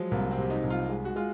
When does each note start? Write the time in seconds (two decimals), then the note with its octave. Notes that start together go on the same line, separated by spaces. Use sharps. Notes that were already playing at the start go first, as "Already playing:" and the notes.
Already playing: F3 F#3 G#3
0.11 C2 A#3
0.31 C4
0.38 C3
0.50 D#4
0.64 C2
0.70 F4
0.89 G#3
1.05 F#4
1.16 G#3 F4